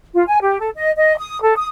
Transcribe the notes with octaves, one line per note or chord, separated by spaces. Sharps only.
F4
G#5
G4
A4
D#5
D#5
D#6
A4
D#6